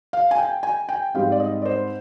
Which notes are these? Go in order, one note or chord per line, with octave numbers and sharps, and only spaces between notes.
F5
G#5
G5
G#5
G5
G#2 G3 C4 F5
D5
D#5
D5
C5